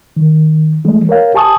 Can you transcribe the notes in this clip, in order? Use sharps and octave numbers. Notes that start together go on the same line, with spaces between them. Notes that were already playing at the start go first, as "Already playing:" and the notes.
D#3
E3 G#3 A3
A#4 C#5 F5
G4 G#5 A5 C#6 D#6